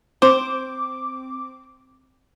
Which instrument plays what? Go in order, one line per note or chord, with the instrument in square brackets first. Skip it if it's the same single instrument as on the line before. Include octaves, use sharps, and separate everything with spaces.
[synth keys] C4 D6 [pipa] C5